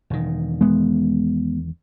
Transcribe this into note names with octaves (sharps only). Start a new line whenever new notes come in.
E1 D#3
G#3 B3